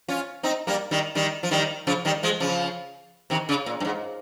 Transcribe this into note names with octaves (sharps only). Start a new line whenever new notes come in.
C#4 F4
C4 D#4
G3 A#3
D#3 G3
D#3 G3
F3
D#3 G3
C#3 F3
D#3 G3
F3 G#3
C#3 F3
C3 D#3
C#3
A#2
G2
G#2